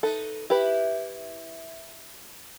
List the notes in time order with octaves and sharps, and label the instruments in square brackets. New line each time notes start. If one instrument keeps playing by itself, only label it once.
[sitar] D#4 B4 [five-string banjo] A4
[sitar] E4 [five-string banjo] G4 B4